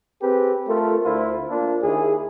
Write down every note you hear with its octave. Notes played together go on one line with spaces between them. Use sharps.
C4 G4 G#4 B4
A3 F4 A4 A#4
D2 E4 F4 C5
A#3 D4 F4
D#2 E4 G#4